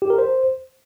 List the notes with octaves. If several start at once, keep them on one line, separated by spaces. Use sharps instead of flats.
G4
A#4
C5